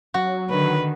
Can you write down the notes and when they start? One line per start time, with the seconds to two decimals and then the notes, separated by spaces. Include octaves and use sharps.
0.14 F#3 F#4
0.50 D3 D#3 B4